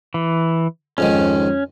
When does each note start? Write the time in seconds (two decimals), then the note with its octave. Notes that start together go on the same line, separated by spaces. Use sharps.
0.14 E3
0.98 F2 G#2 D#3 C#4